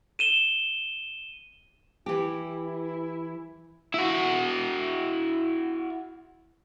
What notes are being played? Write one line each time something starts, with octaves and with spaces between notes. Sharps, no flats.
D#7 E7 G7
E3 E4 G4
E4 F#4